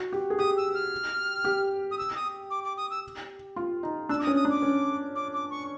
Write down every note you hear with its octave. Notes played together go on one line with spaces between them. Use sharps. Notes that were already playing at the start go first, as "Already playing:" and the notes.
Already playing: F#4
G4
G#4
G4 D#6
E6
F6
G4
D#6
E6
D#6
D6
D6
D#6
E6
F4
D#4
D4 E6
D6
D#6
C#4
D#6
D4 D6
C#4
D6
D6
C#6